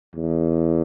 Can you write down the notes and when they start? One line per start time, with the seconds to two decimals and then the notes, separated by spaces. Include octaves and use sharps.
0.16 E2